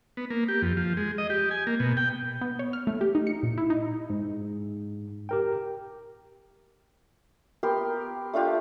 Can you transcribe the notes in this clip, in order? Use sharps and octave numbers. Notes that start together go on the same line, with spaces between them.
B3
A#3
G4
F2
F3
G#3
D#5
G4
G#5
A#3
B2
G5
B3
C#5
F6
A3
G4
D#4
C#7
A#2
E4
D#4
G#2
G4 A#4 G5
B3 G4 A#4 C6
A3 D4 F4 G4